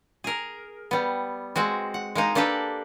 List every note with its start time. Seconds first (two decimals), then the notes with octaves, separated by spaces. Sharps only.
0.24 G#4 A#4
0.91 G3 B3
1.56 G#3 C4 F#4
1.94 F#5
2.15 G#3 A#3 D#4
2.35 A#3 D4 G4 A4 B4